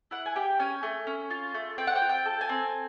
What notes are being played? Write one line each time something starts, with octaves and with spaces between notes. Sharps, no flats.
E4 F#5
G#5
G4 G5
C#4 G#5
A3
C#4
F4
A3
C4 G5
F#5
G5
F4
G5
A4
G#5
C4